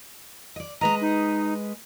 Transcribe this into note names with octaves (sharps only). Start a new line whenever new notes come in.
D5 D#5
G#3 B4 D#5 A#5
D#4